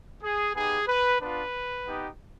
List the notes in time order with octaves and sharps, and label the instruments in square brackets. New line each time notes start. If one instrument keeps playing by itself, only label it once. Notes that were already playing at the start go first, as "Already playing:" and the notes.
[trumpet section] G#4
B3 D#4 G4 G#4
B4
B3 D4 F4 B4
B3 D#4 G4